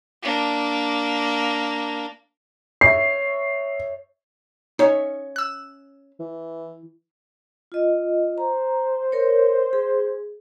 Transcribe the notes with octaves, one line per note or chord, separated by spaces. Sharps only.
A#3 D4
C#5 E5 C7
C#4 D#4 C#5 E5 F5
E6 F#6
E3
F4 D#5
C5 A#5
A#4 C#5
G#4